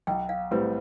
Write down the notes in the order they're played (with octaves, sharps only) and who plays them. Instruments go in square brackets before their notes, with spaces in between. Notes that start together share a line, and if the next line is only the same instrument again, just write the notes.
[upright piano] B1 [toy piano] G5
[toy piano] F5
[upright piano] A2 G3 C4 [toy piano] B4